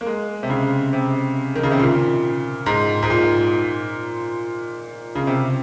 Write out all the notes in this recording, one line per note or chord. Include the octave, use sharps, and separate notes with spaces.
A#3
G#3
C3
C#3
C3
D#3
C#3
C3
A#2
G#2
G#2
A#2
C#3
C3